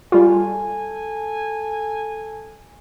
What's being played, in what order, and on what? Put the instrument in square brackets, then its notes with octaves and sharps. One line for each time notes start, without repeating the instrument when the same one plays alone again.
[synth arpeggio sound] G3 F4 [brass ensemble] A4 G#5